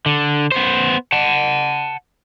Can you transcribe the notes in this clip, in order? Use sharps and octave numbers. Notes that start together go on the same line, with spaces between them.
D3
B3 C5
F#5 A5